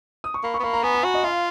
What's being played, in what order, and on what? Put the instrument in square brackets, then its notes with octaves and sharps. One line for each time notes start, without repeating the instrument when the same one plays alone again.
[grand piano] D#6
C#6
[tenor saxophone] A#3 [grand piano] B5
[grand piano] C#6
[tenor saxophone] B3
[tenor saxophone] A#3 [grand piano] B5
[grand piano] A#5
[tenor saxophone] B3 [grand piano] G#5
[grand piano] G#5
[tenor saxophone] F#4
[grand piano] D#5
[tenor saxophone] F4 [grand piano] F5